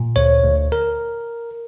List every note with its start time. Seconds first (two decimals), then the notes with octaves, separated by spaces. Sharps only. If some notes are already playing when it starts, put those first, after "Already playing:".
Already playing: A#2
0.16 D2 C#5
0.43 D2
0.72 A#4